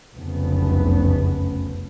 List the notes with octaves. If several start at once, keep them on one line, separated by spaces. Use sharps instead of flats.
F1 C2 F#2 C#3 A3 B3